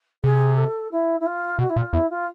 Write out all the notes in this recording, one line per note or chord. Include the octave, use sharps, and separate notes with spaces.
C3 G#4
A4
E4
E4
F4
B2 F#4
E4
A#2 F4
E2 E4
F4